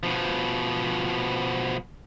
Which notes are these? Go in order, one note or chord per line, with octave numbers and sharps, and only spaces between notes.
B2 F3